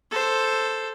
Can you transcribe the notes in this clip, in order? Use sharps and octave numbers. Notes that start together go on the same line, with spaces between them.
A4 C5